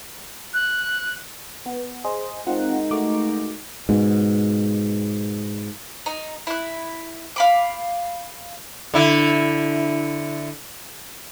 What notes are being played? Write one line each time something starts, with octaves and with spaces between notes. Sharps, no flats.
F#6
B3
G#4 C5 D#5
G#3 A#3 C4 D#4 F4 F#5
A3 F#4 D6
G#2 B2
D#4
E4 F#6
F5 B5 D6
D3 E4